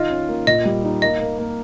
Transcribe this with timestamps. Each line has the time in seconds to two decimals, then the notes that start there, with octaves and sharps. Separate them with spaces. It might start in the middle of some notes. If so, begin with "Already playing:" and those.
Already playing: D#3 F4 D#5
0.10 C#4
0.28 A#3
0.47 A#2 D#5
0.65 G3
0.84 D#4
1.02 A#3 D#5
1.20 A#3
1.39 A#3